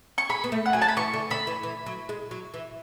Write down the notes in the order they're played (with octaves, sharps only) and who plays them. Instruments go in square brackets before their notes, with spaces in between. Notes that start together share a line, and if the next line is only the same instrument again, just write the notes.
[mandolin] C#6
[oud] G#4 [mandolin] B5
[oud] B3
A3
[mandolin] F#5
[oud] F#3 [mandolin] G#5
[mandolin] A5
B5
[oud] E3 [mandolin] C#6
[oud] D3
[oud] D3 [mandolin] B5
[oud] E3
E3
F#3
G#3
F#3
E3